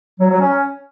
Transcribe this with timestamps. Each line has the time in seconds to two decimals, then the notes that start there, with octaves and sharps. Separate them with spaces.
0.20 F#3
0.30 F#3
0.40 C#4